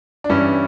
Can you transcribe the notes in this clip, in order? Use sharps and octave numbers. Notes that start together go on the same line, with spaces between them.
D4
G2 E3 G3 C#4 E4